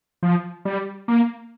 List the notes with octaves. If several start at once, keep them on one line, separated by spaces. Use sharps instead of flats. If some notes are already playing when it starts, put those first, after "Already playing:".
F3
G3
A#3